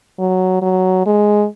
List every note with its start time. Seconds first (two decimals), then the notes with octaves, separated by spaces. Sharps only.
0.19 F#3
0.62 F#3
1.06 G#3